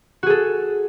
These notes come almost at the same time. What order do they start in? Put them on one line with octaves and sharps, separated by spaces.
F#4 G#4 A4